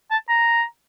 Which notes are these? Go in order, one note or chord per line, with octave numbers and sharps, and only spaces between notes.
A5
A#5